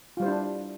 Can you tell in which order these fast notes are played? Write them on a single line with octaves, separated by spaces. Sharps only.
F4 G3 C5 E4 D4